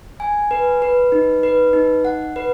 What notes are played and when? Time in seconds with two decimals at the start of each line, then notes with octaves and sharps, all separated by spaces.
0.20 G#5
0.51 B4
0.82 B4
1.12 D#4
1.43 B4
1.73 D#4
2.05 F#5
2.36 B4